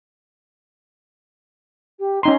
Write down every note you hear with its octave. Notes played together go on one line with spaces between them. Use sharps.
G4
C#4 D#4 A#5 C6